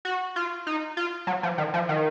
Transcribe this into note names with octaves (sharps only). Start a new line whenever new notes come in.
F#4
F4
D#4
F4
F#3
F3
D#3
F3
D#3